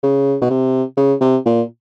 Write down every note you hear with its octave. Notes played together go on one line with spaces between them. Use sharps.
C#3
B2
C3
C#3
C3
A#2